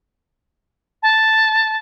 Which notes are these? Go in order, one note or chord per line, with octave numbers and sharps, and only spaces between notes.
A5